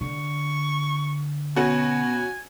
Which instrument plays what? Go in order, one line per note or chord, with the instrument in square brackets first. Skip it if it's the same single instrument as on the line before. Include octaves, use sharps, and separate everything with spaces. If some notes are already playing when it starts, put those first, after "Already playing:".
[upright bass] D3 [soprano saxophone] C#6
[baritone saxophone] B2 [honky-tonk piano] C#4 F#4 [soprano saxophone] G#5